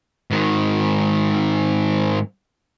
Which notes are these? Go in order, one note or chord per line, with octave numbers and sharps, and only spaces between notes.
G#2 D#3